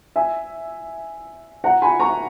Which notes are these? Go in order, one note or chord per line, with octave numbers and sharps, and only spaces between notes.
E5 G#5
F#5 A#5
G#5 B5
A#5 C#6